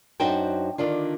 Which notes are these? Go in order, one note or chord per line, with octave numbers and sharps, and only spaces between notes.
F#2 D4 D#4 F#4 C5 G5
D3 D#3 D4 F4